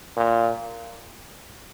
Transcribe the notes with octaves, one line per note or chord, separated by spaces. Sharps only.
A#2